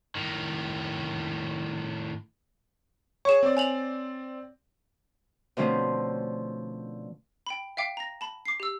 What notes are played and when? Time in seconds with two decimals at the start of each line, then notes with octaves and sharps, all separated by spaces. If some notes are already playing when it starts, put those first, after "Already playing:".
0.15 A2 D#3
3.25 G#4 C#5 C#6 E7
3.43 C4 D5
3.57 G#5 F7 F#7
5.57 B2 D3 F3 A3 C4 C#4
7.46 G5 B5
7.77 E5 F5 G5 D6
7.97 A#5 A#6
8.21 A5 B5
8.45 D6 C7
8.60 G4 E6